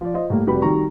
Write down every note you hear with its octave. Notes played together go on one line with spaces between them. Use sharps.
F3 D5
F4 C5 D#5
A2 G3 A#3
F1 G3 F#4 G4 B4 B5
D#3 G3 D#4 F#4 A#5 C#6